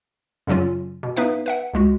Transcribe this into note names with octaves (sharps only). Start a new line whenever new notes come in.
F#2 C#3 F#3 C#4 F4
B2
B3 D#4 B4 E5 F5
B4 E5 F#5
C#2 G#3 F#4